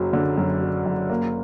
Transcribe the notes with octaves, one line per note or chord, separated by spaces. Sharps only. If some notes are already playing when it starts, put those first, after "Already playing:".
Already playing: F#1 F#3
D3
F#2
F#3
F#1
A#3